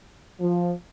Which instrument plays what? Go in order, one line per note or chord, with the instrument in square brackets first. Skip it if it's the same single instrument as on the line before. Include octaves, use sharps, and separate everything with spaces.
[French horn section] F3